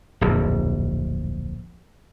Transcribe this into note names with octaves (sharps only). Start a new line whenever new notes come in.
D1 A#1 F2